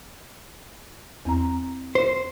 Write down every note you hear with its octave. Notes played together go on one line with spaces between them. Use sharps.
E2 C4 A#5
C5